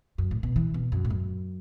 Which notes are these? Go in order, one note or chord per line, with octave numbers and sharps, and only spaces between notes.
F#2
A2
B2
E3
B2
F#2
A2
F#2